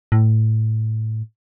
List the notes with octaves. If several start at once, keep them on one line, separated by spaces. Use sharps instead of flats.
A2